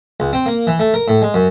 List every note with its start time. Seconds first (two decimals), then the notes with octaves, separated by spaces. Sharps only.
0.20 C#2
0.33 C4
0.46 A#3
0.67 E3
0.79 A3
0.94 A#4
1.08 A2
1.22 G#3
1.34 F#2